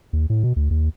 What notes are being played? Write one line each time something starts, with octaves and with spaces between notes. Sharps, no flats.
D#2
A2
B2
D2
D#2